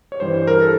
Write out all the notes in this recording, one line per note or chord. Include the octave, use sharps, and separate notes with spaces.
C#5
G2 E3 G3 C5
C5
A#4
A4